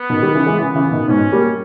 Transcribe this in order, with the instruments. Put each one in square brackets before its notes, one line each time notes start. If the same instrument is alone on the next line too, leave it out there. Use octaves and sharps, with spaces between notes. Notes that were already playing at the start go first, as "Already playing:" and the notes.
Already playing: [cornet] B3
[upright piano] B2 D#3
D#3 G3
C#3 E3
E3 G#3
[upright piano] C#3 E3 [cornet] B3
[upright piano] C#3 E3
B2 D#3
[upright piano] G#2 B2 [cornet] C#4
[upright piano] G3 A#3